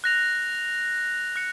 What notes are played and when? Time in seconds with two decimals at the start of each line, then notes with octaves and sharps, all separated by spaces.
0.04 F#6 A#6 F7
1.36 F#6 C#7